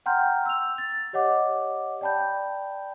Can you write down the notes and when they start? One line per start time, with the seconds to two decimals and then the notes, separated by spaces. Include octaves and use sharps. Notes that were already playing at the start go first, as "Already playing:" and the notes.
0.06 F#5 G5 A#5 C6 F6 G6
0.46 E6 F7
0.78 A6
1.13 G4 C#5 D#5 F#5 D6
2.01 D5 G5 A5 B5 G6